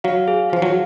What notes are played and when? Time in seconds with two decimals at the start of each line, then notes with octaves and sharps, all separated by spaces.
0.04 F#3 F5
0.28 G#4
0.50 F3 F5
0.62 F#3